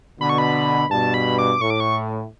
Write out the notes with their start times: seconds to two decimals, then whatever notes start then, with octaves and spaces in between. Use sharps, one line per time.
0.20 B2 D3 B5
0.29 C#6
0.38 B5
0.90 G2 B2 A5
1.14 B5
1.38 D6
1.61 A2 C#6
1.70 D6
1.80 C#6